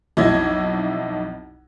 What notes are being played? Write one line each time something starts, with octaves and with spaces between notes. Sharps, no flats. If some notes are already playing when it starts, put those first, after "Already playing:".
B1 F2 E4 D#5 G#6